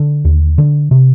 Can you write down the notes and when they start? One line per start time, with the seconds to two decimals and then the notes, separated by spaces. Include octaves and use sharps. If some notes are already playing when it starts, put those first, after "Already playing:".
Already playing: D3
0.25 D#2
0.58 D3
0.91 C3